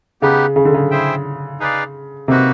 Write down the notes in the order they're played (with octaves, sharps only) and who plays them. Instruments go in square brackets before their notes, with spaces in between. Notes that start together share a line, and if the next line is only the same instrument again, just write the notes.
[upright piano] C#3 [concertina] B3 D#4 G4 B4
[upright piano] C#3
D3
C#3
[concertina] E4 G#4 C5 E5 G5
D#4 G#4 B4 D5 F5
[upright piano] C3 [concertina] A#3 D#4 F#4 B4